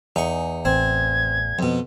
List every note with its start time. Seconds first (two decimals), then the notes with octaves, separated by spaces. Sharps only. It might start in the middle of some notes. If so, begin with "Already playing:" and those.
0.16 E2 D#4 C#6
0.65 A1 C4 G#6
1.59 F2 B2